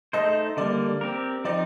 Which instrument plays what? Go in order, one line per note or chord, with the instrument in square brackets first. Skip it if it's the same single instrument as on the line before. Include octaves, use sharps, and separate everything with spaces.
[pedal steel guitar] A3 D#4 A4 C5 [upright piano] D#5
[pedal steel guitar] D3 G3 A#3 [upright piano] D5
[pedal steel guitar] C4 G4 A#4
[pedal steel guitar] F3 C4 D#4 [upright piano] D5